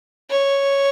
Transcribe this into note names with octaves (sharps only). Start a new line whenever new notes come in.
C#5